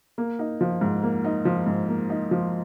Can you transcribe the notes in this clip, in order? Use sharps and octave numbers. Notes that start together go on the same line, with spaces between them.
A#3
D#4
F3
G#2
A#3
D#4
F3
G#2
A#3
D#4
F3